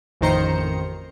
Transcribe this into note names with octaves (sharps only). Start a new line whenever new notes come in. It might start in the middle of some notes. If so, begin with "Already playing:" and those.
A1 F2 D#3 C5 A#5 C#7